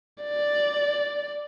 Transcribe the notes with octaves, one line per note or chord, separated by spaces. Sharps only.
D5